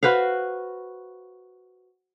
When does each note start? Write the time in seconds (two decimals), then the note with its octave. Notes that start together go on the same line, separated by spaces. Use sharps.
0.03 F#4 B4 C5 F5